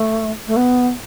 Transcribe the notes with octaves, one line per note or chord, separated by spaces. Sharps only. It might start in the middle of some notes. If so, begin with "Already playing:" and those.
Already playing: A3
A3
B3